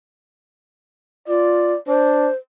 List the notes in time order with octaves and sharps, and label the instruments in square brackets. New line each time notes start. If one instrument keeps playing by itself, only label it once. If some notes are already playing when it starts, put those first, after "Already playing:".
[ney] F4 [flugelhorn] D5
[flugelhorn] D4 [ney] C5